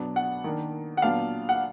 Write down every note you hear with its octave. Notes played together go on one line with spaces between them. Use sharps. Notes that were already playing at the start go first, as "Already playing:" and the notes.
Already playing: B2 F#3 B3 D4
F#5
D#3 A#3 D4
F#5
A#2 F#3 B3 D4 F5
F#5